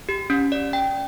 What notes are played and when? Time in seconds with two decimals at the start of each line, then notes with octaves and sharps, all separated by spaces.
0.09 G4
0.30 C#4
0.52 D5
0.73 G5